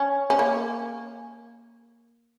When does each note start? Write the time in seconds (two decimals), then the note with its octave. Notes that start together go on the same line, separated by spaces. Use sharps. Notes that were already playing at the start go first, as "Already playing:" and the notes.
Already playing: C#4
0.30 C#4
0.39 A#3